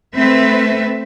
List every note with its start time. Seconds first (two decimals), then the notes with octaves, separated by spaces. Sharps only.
0.16 A3 C4 B4 E5